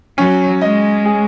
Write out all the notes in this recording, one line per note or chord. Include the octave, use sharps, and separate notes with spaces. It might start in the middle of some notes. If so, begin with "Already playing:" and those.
F#3 C#4
G#3 D#5
G#4